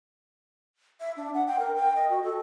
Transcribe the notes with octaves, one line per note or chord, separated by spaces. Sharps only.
E5
D4
F#5
G5
A#4
G5
D#5
F#4
A4